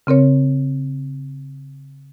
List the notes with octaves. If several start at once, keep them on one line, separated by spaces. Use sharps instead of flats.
C#3 C4 A#4 C#5